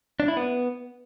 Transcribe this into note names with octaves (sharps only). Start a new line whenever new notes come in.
D4
E4
B3